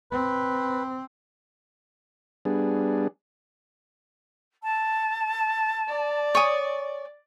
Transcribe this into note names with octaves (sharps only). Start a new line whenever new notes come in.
C4 B4
G3 B3 D4 G#4
A5
D5
C#5 G#5 D#6